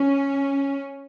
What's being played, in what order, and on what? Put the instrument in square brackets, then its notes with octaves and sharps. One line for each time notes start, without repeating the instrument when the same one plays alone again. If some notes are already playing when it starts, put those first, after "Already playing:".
Already playing: [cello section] C#4